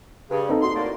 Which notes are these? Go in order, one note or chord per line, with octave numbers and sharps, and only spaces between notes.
G2 C#3
C4 D#4 A4
F#4 D#5 C6
A2 A#3 D5